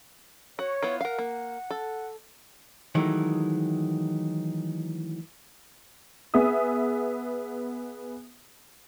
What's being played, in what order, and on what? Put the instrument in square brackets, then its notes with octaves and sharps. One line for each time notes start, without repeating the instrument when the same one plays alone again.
[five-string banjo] F#4 [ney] C#5
[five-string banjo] B3 E4 F4
[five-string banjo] A#4 F5 [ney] F#5
[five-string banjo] A#3
A4
[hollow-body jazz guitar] D#3 E3 F#3 G#3 A3
[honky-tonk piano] B3 G#4 E5 D#6